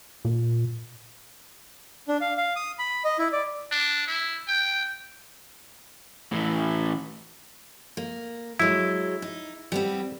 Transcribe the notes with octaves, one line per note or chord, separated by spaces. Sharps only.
A#2
D4
F5
F5
D#6
B5
D#5
E4
D5
D4
E4
G5
A2 E3
A#3
F#3 G#3 E4
D#4
G3 B3 C4